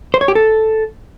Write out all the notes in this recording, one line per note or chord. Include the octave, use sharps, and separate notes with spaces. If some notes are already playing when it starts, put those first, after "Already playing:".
C5
C#5
G4
A4